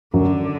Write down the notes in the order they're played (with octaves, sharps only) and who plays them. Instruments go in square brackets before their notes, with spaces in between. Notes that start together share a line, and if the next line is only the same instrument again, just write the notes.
[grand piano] F#2 F#3 [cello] D3